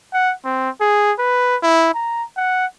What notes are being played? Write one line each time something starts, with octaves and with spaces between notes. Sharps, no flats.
F#5
C4
G#4
B4
E4
A#5
F#5